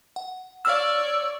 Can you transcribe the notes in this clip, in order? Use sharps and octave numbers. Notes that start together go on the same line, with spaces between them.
F#5
C#5 D5 F5 E6 F6